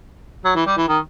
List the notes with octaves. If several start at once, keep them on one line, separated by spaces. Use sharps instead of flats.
F#3
E3
G3
E3
D#3